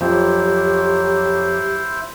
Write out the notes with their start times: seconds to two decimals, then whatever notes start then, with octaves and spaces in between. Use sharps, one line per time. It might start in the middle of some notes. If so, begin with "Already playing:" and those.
0.01 F2 F#3 E4 G4 C5